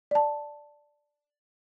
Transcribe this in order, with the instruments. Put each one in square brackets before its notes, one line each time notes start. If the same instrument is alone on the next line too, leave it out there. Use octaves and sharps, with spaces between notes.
[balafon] D5 A5